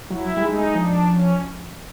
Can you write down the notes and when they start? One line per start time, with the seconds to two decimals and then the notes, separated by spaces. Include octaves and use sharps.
0.10 F#3 E4
0.37 G3
0.42 G#3 D#4
0.59 G#3
0.74 F3 D4
1.07 C#4